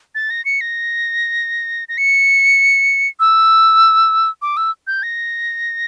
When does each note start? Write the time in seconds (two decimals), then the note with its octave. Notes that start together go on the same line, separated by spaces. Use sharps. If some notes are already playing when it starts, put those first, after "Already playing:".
0.15 A6
0.30 A#6
0.45 C#7
0.61 A#6
1.89 A#6
1.98 C#7
3.20 E6
4.42 D6
4.57 E6
4.87 G6
5.03 A#6